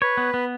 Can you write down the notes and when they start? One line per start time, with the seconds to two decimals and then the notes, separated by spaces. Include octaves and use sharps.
0.02 B4 C#5
0.17 B3
0.34 B3